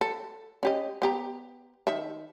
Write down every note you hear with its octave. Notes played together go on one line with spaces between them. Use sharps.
A4
C#4 G4 D#5
B3 G4 A#5
D#3 E5